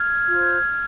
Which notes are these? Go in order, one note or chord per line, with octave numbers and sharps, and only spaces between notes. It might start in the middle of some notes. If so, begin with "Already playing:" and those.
Already playing: F6 G#6
F4 C5